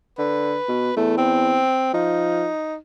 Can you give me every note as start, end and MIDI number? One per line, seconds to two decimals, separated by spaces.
0.18 0.55 50
0.18 0.95 71
0.68 0.91 47
0.97 1.62 40
0.97 1.14 57
1.18 1.90 60
1.94 2.47 53
1.94 2.75 63